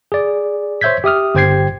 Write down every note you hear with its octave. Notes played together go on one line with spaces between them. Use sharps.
G#4 D5
C5 C#5 E5 G6 G#6 B6
G4 E5 D#6 F6
G1 G4 C5 G5 G#6 C7